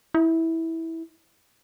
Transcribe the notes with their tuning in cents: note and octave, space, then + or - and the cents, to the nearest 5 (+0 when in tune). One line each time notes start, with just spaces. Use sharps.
E4 -15